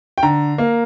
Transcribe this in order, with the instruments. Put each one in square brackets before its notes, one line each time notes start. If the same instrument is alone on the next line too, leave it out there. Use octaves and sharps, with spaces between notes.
[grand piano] G5
D3 A#5
A#3